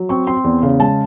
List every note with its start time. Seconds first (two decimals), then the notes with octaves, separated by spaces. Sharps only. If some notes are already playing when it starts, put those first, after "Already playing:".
Already playing: F#3
0.09 C4 C#6
0.27 C4 C6
0.44 E2
0.63 C#3
0.80 G#3 A5